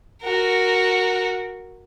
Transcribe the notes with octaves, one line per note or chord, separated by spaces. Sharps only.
F#4 A#4